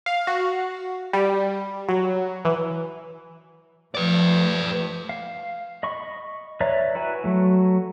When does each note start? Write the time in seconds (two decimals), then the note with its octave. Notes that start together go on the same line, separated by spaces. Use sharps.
0.06 F5
0.27 F#4
1.13 G3
1.89 F#3
2.45 E3
3.95 F3 A3 B4 D5
5.09 F5
5.83 D#5 B5 C#6
6.60 B4 C#5 D5 E5 A#5
6.95 E4 F#4 B4 G#5
7.24 F#3 A3